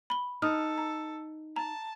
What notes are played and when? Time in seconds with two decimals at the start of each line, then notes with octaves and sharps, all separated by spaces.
0.10 B5 G7
0.42 D#4 A4 D#6 F6
0.78 A#5
1.56 A5 A#5